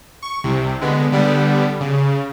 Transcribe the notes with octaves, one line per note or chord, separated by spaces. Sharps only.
C#6
C2 C3
D3 G#3 B3
D3 G3 B3
C#3